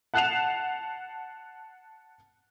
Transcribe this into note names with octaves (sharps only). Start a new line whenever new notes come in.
F#5 A5 F#6 C7 E7 F7